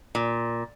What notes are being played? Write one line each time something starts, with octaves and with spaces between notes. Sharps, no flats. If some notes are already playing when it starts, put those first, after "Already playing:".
A#2